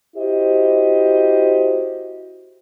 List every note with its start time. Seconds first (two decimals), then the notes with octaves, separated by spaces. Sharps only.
0.15 E4 F#4 G4 C5 D#5